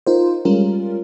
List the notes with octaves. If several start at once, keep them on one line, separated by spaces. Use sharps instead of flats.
D#4 F4 A#4 C5
G3 G#3 C#4 F4 A#4